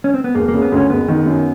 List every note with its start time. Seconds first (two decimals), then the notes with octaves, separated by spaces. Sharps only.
0.04 C#4
0.14 C4
0.24 B3
0.34 E1 A#3
0.48 A#3
0.54 C#3
0.62 B3
0.72 D2 C#4
0.90 F#1 B3
1.08 D#3
1.26 F#2